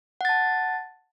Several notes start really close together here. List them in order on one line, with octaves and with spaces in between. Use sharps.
F#5 A6 A5